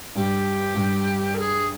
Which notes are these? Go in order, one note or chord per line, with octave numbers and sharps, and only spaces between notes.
G2 G3 G4
G2 G3
A#4
G#4